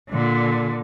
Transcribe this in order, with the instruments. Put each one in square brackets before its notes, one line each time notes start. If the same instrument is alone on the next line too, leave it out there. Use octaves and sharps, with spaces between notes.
[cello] A#2 D3